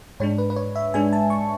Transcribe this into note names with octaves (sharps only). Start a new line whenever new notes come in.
G#2 G#3 D4 C#5
B4
B4
C#5
E5
G#2 G#3 D4 G#5
A5
C#6